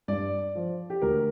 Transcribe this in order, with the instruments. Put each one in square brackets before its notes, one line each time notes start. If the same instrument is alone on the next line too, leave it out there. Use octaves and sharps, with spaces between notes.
[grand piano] G2 D5
F3
G4
D2 A#4